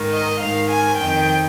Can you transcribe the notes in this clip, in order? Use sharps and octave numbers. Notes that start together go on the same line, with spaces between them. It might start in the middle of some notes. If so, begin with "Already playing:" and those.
Already playing: G#2 D#3
D#5
G#2 D#3 F5
G#5
F2 D#3 G5